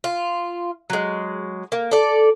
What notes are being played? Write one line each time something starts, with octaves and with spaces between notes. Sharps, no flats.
F4
F#3 G#3
A#3
A4 D5